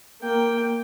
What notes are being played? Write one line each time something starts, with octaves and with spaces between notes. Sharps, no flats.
A#3 G5